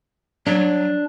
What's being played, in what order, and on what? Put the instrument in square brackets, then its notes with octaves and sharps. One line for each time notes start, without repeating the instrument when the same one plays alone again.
[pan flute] F#3 [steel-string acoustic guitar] D4